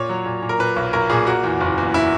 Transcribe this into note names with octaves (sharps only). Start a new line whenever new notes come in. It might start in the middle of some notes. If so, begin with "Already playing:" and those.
Already playing: A#2 C#5
F#3
A#2
A#2
A#4
A#2 B4
B1
B1 A#4
A#2 G#4
A#3 F#4
E2
F#1
E2
E4